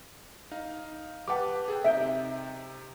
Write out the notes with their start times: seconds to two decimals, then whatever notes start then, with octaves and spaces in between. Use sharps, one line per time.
0.51 D#4 F5
1.28 G4 B4 F#5 A5 D6
1.68 G#4 A4 G5
1.84 C3 D#4 E5 G6 D7